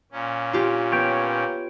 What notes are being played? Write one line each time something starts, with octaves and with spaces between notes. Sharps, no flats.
A#2 C#4
F4 G4
B3 C#5 G5